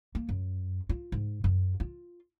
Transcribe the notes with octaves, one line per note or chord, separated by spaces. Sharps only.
A#3
F#2
F4
G#2
F#2
F4